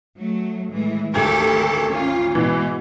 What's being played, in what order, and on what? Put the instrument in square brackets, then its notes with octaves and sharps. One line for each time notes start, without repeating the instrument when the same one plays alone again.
[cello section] F#3 A3
A2 E3 G#3
[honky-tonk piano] G#1 D2 [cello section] G4 A4 A#4
[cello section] C#4 F4
[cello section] G#2 B2 G#3 [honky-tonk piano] E3